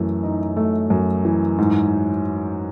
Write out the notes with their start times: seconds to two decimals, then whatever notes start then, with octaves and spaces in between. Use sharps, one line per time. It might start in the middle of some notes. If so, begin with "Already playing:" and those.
Already playing: F#2 E3 A3
0.23 D#4
0.57 A3
0.90 F#2
1.25 E3
1.58 G#2